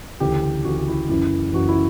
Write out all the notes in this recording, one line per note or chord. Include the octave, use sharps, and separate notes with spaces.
D2 C#3 E3 G4
D2 C#3 E3 F#4
F#4
E4
F#1 F#2 E3 E4
F#1 F#2 E3 F#4
E4